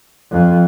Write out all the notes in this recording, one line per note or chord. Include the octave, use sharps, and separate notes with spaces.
F2